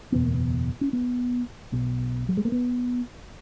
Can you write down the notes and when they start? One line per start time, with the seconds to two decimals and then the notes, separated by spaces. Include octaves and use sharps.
0.12 F#1 E2 B2 B3
0.23 A#3
0.34 B3
0.81 C#4
0.93 B3
1.72 B1 B2
2.29 F#3
2.37 G#3
2.45 A#3
2.52 B3